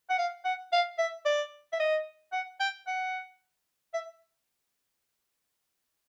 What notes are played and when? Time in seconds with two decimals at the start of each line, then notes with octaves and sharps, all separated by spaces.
0.10 F#5
0.19 F5
0.45 F#5
0.72 F5
0.99 E5
1.25 D5
1.73 E5
1.80 D#5
2.32 F#5
2.60 G5
2.87 F#5
3.94 E5